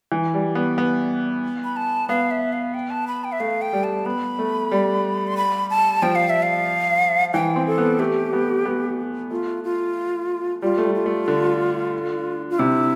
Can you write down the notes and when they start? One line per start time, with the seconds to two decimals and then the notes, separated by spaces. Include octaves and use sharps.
0.12 E3
0.34 G3
0.55 B3
0.78 B3
1.64 B5
1.76 A5
2.09 B3 F5
2.31 E5
2.53 F5
2.74 G5
2.90 A5
3.07 B5
3.24 G5
3.32 E5
3.40 A3 F5
3.62 G5
3.73 G3
3.84 A5
4.06 B3 B5
4.39 A3
4.72 G3
5.27 C6
5.37 B5
5.70 A5
6.02 F3 G5
6.15 F5
6.30 E5
6.43 F5
7.34 E3 G5
7.56 C4
7.67 A4
7.78 B3
7.99 A3 G4
8.33 B3
8.65 B3
9.31 A3 F4
9.64 F4
10.62 G3 F4
10.78 A3
10.84 G3
10.95 F4
11.06 A3
11.28 D3
12.50 F4
12.59 C3 E4